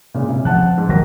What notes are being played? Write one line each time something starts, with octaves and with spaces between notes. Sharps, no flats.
A#2 C#3 G#3
C3
F3 F#5 A5 F#6
G#2
D#3 F#3 F#4 A#4 A#6